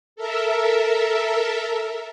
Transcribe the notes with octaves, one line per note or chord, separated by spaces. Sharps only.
A4 A#4 E5